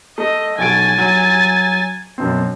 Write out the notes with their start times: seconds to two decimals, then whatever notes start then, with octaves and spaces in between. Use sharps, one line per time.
0.18 A3 D#5
0.58 B1 F#4 G#5 A6 D7
0.98 F#3 D#7
2.18 F#2 B2 C4